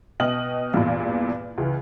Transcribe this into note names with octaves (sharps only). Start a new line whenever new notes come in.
B2 D#5 G5 F6 F#7
E2 G2 A#2
C#2 E3